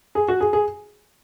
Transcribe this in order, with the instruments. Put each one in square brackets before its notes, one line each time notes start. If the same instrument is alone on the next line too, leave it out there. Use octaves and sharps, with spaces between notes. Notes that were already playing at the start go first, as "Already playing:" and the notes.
[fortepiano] G#4
F#4
G#4
G#4